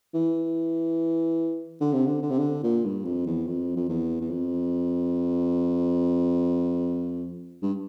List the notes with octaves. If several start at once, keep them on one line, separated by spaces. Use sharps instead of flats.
E3
D3
C3
D3
D3
C3
D3
A#2
G2
F2
E2
F2
F2
E2
E2
F2
G2